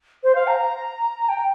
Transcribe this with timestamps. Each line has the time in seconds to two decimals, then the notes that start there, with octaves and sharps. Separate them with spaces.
0.24 C5
0.35 F5
0.47 A#5
1.29 G5